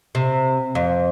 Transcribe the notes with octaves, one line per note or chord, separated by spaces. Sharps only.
C3
F2